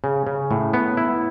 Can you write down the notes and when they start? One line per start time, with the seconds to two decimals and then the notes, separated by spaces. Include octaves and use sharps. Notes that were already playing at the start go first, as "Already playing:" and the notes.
0.04 C#3
0.27 C#3
0.51 A2
0.73 B3
0.97 E4